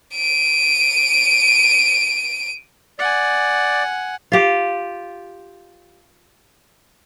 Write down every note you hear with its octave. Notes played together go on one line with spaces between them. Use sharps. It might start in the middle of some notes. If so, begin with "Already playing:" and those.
D7 D#7
D5 F#5 G#5
F4 G4